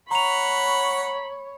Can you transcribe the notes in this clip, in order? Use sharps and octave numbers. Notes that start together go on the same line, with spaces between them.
C#5 F#5 A#5 B5 C#6 F7